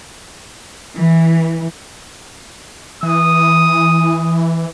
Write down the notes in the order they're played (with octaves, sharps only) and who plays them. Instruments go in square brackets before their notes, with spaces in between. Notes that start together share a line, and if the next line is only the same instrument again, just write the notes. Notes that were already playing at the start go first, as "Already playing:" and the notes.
[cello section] E3
[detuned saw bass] E3 [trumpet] D#6